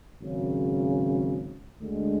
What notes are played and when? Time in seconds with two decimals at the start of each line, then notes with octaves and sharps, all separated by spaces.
0.20 G#1 F#2 C#3
1.79 D2 D3 G#3